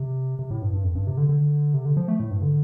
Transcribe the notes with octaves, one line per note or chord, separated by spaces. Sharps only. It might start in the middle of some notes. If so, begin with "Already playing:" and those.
Already playing: C3
C3
A2
G2
G2
F2
G2
C3
D3
D3
C3
D3
F3
A3
A2
G2
D3